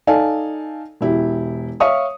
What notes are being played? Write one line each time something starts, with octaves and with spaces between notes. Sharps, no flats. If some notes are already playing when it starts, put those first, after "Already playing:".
D#4 A4 D5 F5 G#5 A5
E1 E4 G4
C#5 E5 F5 C#6 D#6